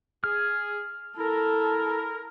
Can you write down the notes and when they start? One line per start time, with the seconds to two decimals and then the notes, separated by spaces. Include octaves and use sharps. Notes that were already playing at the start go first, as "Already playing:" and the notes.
0.24 G#4 F6
1.18 E4 A4 A#4